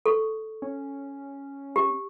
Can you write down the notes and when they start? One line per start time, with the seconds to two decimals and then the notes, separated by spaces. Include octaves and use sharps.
0.06 A4 C#6
0.62 C#4
1.76 G4